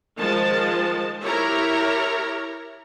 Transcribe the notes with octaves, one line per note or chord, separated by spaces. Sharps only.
D#3 F3 G#3 A5
E4 G4 A#4 C#5 A#5